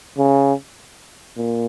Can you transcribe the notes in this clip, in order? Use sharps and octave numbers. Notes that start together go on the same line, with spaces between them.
C#3
A#2